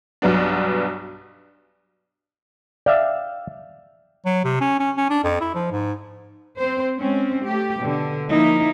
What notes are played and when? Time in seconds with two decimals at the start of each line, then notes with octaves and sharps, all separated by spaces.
0.22 B1 G2 F#3 B3 D4
2.86 D5 E5 F5 G5
4.26 F#3
4.44 C3
4.61 C#4
4.80 C#4
4.97 C#4
5.10 D4
5.24 F2
5.41 E4
5.55 F3
5.72 G#2
6.58 C4 C5
6.97 G#3 C4 C#4
7.44 A3 G4
7.80 B2 D3
8.30 F3 A#3 D#4 E4